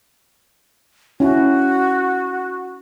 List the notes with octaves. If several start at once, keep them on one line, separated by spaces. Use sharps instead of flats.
C#4 E4 F#4